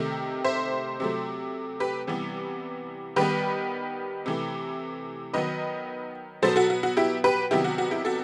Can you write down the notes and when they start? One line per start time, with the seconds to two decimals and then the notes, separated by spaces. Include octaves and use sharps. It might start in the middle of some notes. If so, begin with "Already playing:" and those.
Already playing: C3 D#3 A3
0.44 C5 E5
1.00 C3 F#3 A3
1.80 G4 B4
2.07 C3 E3 G3 B3
3.16 D#3 G3 B3 G4 B4
4.26 C3 E3 A3
5.34 D#3 F#3 B3 B4 D#5
6.42 B2 F#3 B3 A4 C5
6.56 F#4 A4
6.70 F#4
6.83 F#4
6.97 E4 G4
7.24 G4 B4
7.51 C3 D#3 F#3 B3 E4 G4
7.64 F#4
7.78 F#4
7.91 E4 G4
8.05 F#4 A4